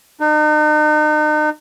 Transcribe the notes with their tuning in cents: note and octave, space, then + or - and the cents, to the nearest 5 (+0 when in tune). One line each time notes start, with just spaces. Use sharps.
D#4 -40